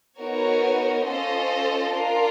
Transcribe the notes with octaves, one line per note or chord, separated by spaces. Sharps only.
B3 D#4 F#4 A#4 C#5
C#4 F4 A4 C5 D#5
D4 F4 A#4